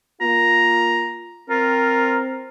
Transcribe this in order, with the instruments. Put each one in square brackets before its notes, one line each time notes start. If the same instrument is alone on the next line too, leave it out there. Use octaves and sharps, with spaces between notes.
[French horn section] A#3 F4 [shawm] A#5
[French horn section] C4 [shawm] F4 [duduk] A#4